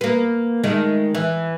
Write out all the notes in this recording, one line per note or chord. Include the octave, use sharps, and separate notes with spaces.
A#3 B3
D#3 G#3 A3
E3